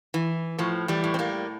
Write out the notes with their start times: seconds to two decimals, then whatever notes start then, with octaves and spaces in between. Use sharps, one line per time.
0.14 E3
0.59 A2 F3
0.88 E3 G3
1.04 A2
1.14 C4
1.19 G3 A#3